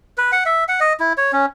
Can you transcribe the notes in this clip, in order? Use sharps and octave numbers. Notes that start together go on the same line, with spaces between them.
B4
F#5
E5
F#5
D#5
E4
C#5
C#4